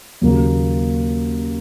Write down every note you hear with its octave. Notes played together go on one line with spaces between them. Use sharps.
D#2 C#3 F#3 A#3